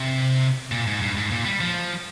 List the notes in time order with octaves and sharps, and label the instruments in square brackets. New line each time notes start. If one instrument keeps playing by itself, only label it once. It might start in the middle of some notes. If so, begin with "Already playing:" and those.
Already playing: [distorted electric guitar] C3
A#2
G#2
G2
G#2
A#2
G3
F3